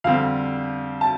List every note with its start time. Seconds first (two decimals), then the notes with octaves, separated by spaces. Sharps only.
0.04 F2 D3 G3 C4 F5
1.01 A5